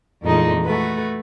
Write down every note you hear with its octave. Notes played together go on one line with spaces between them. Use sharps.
F2 A#2 E3 G#3 A3 D#4
A3 F#4 B4